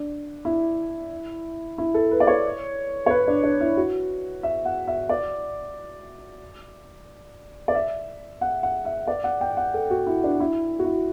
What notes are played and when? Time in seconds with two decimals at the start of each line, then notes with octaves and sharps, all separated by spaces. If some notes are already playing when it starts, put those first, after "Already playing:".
Already playing: D4
0.45 E4
1.78 E4
1.94 A4
2.11 B4
2.20 D5
2.27 C#5
3.06 C#5
3.10 B4
3.28 D4
3.44 D4
3.61 E4
3.77 F#4
4.43 E5
4.65 F#5
4.88 E5
5.09 D5
7.68 D5
7.75 E5
8.41 F#5
8.63 F#5
8.85 E5
9.07 D5
9.24 F#5
9.41 G5
9.57 F#5
9.74 A4
9.90 F#4
10.07 E4
10.24 D4
10.40 E4
10.79 F#4
10.84 E4